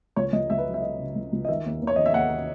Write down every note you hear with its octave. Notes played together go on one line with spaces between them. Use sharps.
C#2 C#5
C#2 D#5
C#2 E5
B4
F#3
E5
F#3 D#5
C#3
C#2
C#2
D#5
D#3 E5
D#2
D#2
C#5
D#3 D#5
E5
D#2 F#5